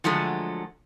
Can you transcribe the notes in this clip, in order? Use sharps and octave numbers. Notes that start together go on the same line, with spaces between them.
D3 F3 F#3 G#3 A3